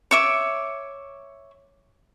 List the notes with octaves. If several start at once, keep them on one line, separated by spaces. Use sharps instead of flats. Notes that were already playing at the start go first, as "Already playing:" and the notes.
C#5 E5 D6